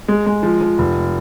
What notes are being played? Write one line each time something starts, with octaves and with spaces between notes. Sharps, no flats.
G#3
G#3
F3
F3
F1